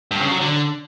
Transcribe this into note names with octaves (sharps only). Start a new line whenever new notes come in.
G2
C#3
F#3
D3